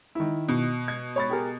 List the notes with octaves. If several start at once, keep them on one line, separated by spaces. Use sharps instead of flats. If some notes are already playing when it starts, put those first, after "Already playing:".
D#3 E4
B2
G#6
C#5 B5 A6
G4 G#4 A#4